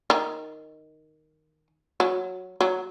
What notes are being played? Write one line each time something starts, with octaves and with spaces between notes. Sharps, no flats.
D#3
F#3
F#3